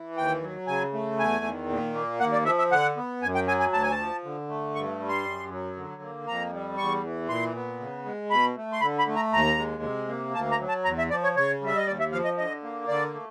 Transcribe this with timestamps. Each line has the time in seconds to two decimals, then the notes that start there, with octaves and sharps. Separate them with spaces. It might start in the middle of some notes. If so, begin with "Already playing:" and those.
Already playing: E3
0.16 D#2 G5
0.43 F#3
0.67 C#3 G#5
0.93 A3
1.19 E2 G#5
1.45 D#3
1.70 A#2
1.94 A#3
2.20 D#2 F#5
2.33 D5
2.46 F3 E5
2.58 E5
2.71 D3 F#5
2.97 B3
3.22 F#2 G#5
3.35 G5
3.47 F#3 G#5
3.60 G#5
3.72 D2 A5
3.83 G#5
3.91 A5
3.99 F3
4.24 D3
4.49 A3
4.75 G2 C#6
5.00 G3
5.09 C6
5.25 F#2
5.51 F#3
5.76 D3
6.02 A#3
6.27 F2 A#5
6.53 G3
6.78 E2 C#6
7.04 E3
7.29 A#2 C6
7.55 B3
7.80 C#3
8.05 G#3
8.30 B2 B5
8.57 A3
8.73 C6
8.81 D3 B5
8.99 B5
9.07 A3
9.16 A#5
9.33 D#2 A#5
9.58 G#3
9.83 C3
10.08 A#3
10.34 D2 A5
10.51 A#5
10.60 F#3
10.68 A5
10.85 E2 A#5
10.98 E5
11.10 F3 D5
11.23 C#5
11.36 C#3 C#5
11.62 G3 E5
11.76 D#5
11.87 D#2 D5
12.00 E5
12.12 F3 F5
12.24 D#5
12.38 D3 D#5
12.63 A#3
12.88 D3 D5
13.14 A3